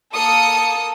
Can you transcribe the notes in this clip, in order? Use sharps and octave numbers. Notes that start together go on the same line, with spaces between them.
A#3 A4 D#6 C#7